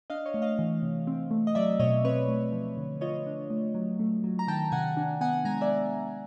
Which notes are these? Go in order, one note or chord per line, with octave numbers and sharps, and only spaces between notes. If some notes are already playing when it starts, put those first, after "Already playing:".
D4 D#5 F5
C#5 D#5
A3
D#5 F5
E3
C3
C4
A3
D#5
F#3 D5 E5
B2 C#5 D#5
C4 B4 C#5
A3
F3
D3
F4 C#5 D#5
D4
A3
F#3
A3
F#3
A#5
D#3 G5 A5
C3 F#5 G#5
D4
B3 F#5 G#5
G#3 G#5 A#5
D5 E5